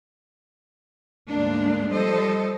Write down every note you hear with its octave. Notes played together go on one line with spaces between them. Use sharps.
D2 G#2 G#3 A#3 D4
F3 G3 A4 C5 D#5